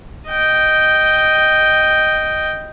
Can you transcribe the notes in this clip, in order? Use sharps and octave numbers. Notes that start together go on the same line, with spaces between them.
D#5 G5